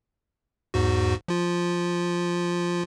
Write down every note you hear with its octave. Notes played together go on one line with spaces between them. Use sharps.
E2 G#2 F#4
F3 F4